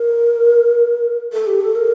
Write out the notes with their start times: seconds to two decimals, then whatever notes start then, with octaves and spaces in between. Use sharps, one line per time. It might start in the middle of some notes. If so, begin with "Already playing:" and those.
Already playing: A#4
1.33 A4
1.47 G4
1.61 A4
1.75 A#4